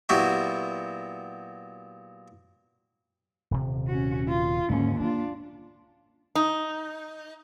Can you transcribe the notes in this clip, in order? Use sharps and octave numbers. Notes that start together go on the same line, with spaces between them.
A#2 F#3 B3 E4 F#4 G4
D#1 C3
C#4 F#4
F4
D#2 G#2 D3 G#3 C#4
A#3 D4 F4
D#4